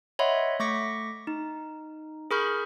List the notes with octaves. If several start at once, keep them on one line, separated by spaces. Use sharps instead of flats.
C#5 D#5 E5 F#5 B5 C6
A3 C#6 D6 A#6 B6 C#7
D#4
G#4 A#4 B5 C#6 F6 G6